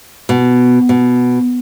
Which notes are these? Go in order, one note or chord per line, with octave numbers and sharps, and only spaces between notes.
B2
B2